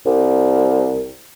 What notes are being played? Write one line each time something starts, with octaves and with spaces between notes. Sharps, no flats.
C2